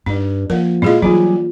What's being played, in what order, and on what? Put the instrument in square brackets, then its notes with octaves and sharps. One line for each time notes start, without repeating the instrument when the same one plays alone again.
[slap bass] G2 [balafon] D#4
[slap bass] F3 [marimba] A#3 F#5 [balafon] A#4
[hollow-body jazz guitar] A#2 G#3 F4 [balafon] E4 G#4 D#5
[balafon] E3 D#4 [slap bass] F#3 G3 [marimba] F4 [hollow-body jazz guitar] G#4 D5